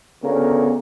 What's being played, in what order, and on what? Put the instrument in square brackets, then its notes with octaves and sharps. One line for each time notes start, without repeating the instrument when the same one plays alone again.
[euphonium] D2 [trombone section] C#3 A#4 [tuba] B3